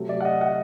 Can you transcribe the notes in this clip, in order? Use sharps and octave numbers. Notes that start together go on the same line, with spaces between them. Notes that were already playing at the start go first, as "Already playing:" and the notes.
Already playing: C3 F#3 A3
D5
F#5
D#5
F#5